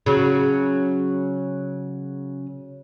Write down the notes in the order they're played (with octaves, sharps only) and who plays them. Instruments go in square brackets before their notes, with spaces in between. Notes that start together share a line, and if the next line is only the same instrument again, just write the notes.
[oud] C#3 F#3